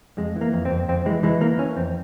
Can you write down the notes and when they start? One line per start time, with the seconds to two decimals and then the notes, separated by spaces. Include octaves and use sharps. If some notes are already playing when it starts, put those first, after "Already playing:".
0.18 F2 G#3
0.36 E3
0.41 A#3
0.53 F2
0.65 C4
0.71 F2
0.88 F2 C4
1.06 E3 G#3
1.23 E3 G#3
1.41 E3 A#3
1.59 E3 C#4
1.76 F2 C4